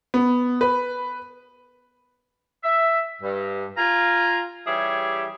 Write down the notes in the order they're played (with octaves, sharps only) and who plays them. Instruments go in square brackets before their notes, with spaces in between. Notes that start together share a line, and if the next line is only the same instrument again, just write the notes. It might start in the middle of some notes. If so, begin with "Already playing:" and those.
[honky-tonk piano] B3
B4
[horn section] E5
G2
F4 G#5 A#5
E3 G3 G4 G#4 C#5 E5